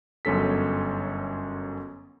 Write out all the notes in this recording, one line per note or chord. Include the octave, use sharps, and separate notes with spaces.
G1 F#2 C#4 A4 B6